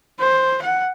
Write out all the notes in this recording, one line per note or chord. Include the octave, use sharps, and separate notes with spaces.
C5
F#5